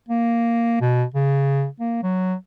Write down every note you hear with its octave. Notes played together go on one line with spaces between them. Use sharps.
A#3
B2
C#3
A#3
F#3